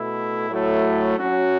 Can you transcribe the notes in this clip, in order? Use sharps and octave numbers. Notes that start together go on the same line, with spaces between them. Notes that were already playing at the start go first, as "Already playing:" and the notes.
Already playing: B2 A3 E4
A2 F#3 A3 E4
F#3 C#4 F#4